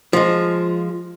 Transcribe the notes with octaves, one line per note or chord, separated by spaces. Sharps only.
F3 G#3